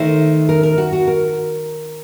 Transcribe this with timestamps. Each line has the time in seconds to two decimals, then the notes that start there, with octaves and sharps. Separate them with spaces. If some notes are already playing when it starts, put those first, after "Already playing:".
Already playing: D#3 A3 D#4 C5
0.49 A#4
0.63 A#4
0.78 F#4
0.93 F#4
1.08 A#4